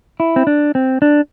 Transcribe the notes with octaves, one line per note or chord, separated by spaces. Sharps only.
E4
C4
D4
C4
D4